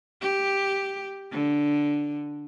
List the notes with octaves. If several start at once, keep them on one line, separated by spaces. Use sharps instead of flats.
G4
D3